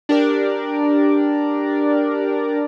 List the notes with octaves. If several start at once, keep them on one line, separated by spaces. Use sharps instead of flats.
D4 G4 A#4 D5